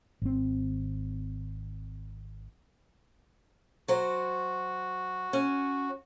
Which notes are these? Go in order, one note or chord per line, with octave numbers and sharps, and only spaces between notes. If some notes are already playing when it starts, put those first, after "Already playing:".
G#1 C4
F#3 F#4 C5
C#4